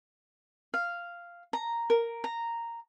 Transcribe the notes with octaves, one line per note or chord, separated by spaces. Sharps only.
F5
A#5
A#4
A#5